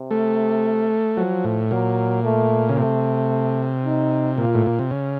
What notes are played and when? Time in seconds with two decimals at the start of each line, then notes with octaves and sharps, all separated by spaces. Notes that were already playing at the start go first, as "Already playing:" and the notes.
Already playing: C3
0.11 A3
1.17 F3 F#3
1.44 A2
1.71 A#2 F#3
2.23 A3
2.69 C#3
2.77 C3 A3
3.84 D#4
4.37 A#2 F4
4.55 A2
4.67 A#2
4.79 C3
4.91 C#3